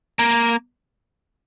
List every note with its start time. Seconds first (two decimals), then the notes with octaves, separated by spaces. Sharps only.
0.19 A#3